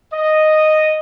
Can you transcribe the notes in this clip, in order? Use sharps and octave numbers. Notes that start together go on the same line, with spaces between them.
D#5